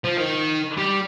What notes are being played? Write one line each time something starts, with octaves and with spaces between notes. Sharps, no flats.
F3
D#3
G3